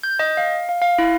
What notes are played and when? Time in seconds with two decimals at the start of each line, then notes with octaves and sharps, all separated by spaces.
0.03 G6
0.19 D#5
0.37 F5
0.69 F5
0.82 F5
0.98 E4